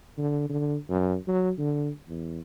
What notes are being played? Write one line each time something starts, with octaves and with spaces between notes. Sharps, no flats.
D3
D3
F#2
F#3
D3
E2